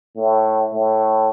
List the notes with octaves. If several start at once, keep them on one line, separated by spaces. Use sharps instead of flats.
A2
A2